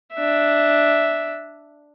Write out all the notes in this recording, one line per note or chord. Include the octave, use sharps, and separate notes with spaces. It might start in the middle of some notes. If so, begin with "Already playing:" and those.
D4 E5